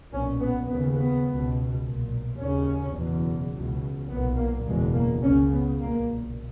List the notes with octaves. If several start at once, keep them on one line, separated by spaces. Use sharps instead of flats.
B1 A#2 C#4
B3
D#2 C#3 B3
B3
C#2 B2
B1 A#2
D#2 C#3 C#4
F#1 E2 B2
C#2 B2
B1 A#2 B3
A#3
F#1 E2 B2 G#3
A#3
C#2 C#3 C#4
B3
B1 A#2 A#3